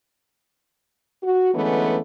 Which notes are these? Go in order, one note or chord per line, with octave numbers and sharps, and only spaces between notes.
F#4
D3 E3 G#3 A3 B3 C#4